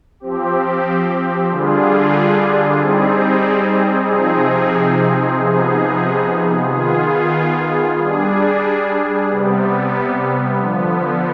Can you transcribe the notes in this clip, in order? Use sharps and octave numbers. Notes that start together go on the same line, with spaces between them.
F3 C4 G4
D3 G3 D4 F4 G#4
G3 C4 D#4 G#4
C3 F3 C4 D#4 G#4
C3 F3 B3 D#4 G#4
D#3 B3 F4 G#4
G3 D4 G#4
C3 G3 B3
D3 F3 B3